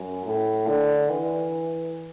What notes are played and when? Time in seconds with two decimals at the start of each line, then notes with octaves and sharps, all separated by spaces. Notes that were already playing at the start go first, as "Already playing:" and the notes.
Already playing: F#2
0.25 A2
0.67 D3
1.09 E3